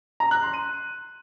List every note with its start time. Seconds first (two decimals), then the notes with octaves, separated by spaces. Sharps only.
0.20 A#5
0.31 F#6
0.42 C6
0.53 D#7